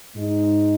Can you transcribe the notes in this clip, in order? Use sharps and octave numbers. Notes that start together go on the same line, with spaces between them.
G#2 G#3 D#4